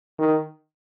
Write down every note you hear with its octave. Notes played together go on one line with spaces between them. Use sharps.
D#3